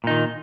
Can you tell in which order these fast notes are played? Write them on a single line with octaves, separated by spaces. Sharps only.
A#2 D#4 D#3